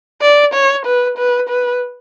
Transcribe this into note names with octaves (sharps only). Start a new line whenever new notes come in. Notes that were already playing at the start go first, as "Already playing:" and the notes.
D5
C#5
B4
B4
B4